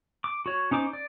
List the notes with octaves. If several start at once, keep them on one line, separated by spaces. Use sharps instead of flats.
D6
F#4 C#5
C#4 D#4 C5 D6
D5